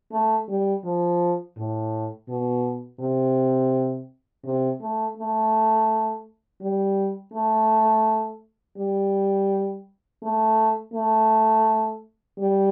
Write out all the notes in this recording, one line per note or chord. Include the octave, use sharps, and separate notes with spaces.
A3
G3
F3
A2
B2
C3
C3
A3
A3
G3
A3
G3
A3
A3
G3